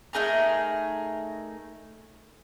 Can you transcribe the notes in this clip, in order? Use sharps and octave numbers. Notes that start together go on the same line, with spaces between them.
A3 D#4 G#4 A#4